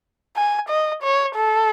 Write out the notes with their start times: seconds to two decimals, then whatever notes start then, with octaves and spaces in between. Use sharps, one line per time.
0.36 G#5
0.69 D#5
1.03 C#5
1.36 A4